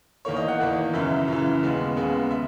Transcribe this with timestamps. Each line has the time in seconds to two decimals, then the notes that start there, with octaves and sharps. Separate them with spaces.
0.25 E2 D#3 A#3 C#5
0.37 D#5
0.48 F#5
0.60 E2 D#3 A#3
0.94 F#2 C#3 E3 E5
1.28 F#2 C#3 E3
1.63 D#2 C#3 G#3 B3
1.97 D#2 C#3 G#3 B3
2.31 E5